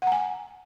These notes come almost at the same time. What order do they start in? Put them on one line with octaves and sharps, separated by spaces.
F#5 A#5 G#5